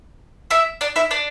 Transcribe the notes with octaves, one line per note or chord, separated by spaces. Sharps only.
E4 E5
D4 D5
E4 E5
D4 D5